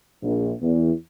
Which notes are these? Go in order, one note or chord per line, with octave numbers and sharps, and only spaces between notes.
A#1
E2